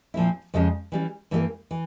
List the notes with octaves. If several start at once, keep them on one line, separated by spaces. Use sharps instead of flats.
A#2 F3 C4 E4
F2 C#3 F3 G#3 C#4
E3 G3 C#4
G2 E3 G3 A#3
E3